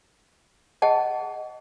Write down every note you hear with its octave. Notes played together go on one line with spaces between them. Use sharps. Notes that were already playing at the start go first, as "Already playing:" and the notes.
G#4 D#5 F#5 A5